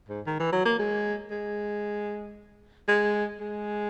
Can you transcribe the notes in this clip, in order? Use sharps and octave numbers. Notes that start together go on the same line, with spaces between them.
G#2
D#3
E3
F#3
A#3
G#3
G#3
G#3
G#3